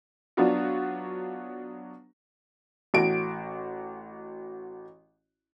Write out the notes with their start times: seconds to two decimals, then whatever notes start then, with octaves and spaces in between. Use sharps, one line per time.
0.37 F#3 B3 D4 F4 F#4
2.94 A1 F#4 D7